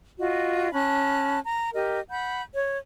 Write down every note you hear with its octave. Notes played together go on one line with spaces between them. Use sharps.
F4 F#4 D#5
C#4 A5 B5 F#6
A#5
G4 A#4 D#5
F#5 B5 G6
C#5